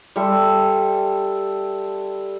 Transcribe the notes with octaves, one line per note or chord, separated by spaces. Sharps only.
G3 A4 E5 C6